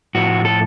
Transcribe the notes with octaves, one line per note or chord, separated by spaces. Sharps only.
A2 F3 A3 F#4
A4